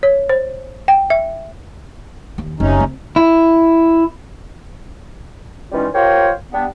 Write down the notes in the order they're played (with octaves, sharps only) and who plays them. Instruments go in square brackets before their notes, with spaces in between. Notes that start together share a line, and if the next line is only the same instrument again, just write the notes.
[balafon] C#5
C5
G5
E5
[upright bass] D#2
[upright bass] F#1 [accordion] C3 C#4 D#4
[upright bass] C4
[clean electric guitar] E4
[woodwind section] E3 G3 G#3 C#4 D#4 F4
F4 G4 A#4 C5 C#5
G3 B3 D4